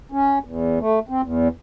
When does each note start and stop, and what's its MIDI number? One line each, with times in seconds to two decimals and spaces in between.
0.12 0.39 61
0.44 0.79 40
0.79 0.99 57
1.09 1.21 60
1.22 1.48 40